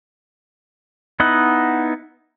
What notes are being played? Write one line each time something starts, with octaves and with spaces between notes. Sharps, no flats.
B3 D#4 E4 D#5 F#5